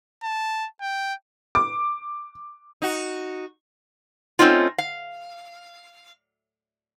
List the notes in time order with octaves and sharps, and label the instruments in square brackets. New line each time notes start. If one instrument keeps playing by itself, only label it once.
[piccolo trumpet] A5
G5
[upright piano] D6
[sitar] D#4 F#4
[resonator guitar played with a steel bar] A3 C4 C#4 D#4 F4
F5